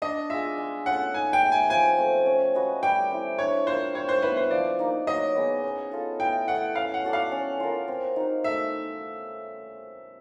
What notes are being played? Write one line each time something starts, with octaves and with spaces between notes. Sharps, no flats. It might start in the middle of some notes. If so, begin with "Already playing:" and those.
D4 D#5
F4 G#4 E5
G#3
C#4 F4 A4 F#5
D#4 G#5
G5
G#4 B4 E5
G#5
F3 G#5
A3 C4
C#4
F#4 B4 D#5
G3 G5
C4 E4
D4 C#5
F4 A#4 C5
G3 C#5
C5
B3 E4 B4
C5
F3 D5
A#3 D#4
F#3 D#5
B3 D#4 G#4
C#4
F4 A4
E4 G5
A4 C#5 F#5
C#4 F5
F#5
F#4 A4 D5
F5
C#4
F4 A#4
C4
D#4 F#4
A3 E5